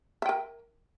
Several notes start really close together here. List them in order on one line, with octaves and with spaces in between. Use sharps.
E5 G5 A#4